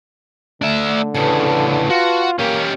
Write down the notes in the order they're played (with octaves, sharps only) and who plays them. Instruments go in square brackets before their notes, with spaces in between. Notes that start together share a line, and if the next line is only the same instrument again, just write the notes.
[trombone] D3 [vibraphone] A3 [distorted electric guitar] D4 E5
[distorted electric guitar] A2 C#3 [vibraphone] B4 A5
[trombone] F4 [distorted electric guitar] F#4
[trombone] A#3 [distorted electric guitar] C#4 G4